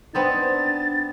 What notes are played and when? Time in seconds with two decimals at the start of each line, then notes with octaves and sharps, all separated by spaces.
0.14 B3 C4 D4 D#4 A6